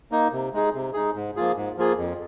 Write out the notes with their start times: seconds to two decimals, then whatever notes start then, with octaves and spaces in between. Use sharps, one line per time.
0.11 A#3 D#4
0.33 C3
0.53 G#3 D#4 G#4
0.74 C3
0.93 G#3 D#4 G#4
1.14 G#2
1.36 F3 A#3 F4 G#4
1.56 G#2
1.77 F3 A#3 F4 G#4
1.97 F2